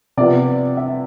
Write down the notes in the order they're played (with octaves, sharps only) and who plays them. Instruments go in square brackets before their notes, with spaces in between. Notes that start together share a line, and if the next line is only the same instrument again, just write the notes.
[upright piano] C3 F3 B3 F4 D5
E5